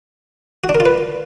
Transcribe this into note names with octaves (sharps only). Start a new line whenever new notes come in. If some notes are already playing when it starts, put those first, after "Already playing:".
F#4
D4
A#4
F4
B4